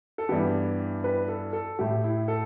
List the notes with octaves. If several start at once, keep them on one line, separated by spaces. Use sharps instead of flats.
A4
G2 E3 B3 G4
B4
A4
A4
A2 A3 G4
E4
A4